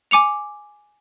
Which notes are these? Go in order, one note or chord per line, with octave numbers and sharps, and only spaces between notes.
G#5 D6 C#7 F7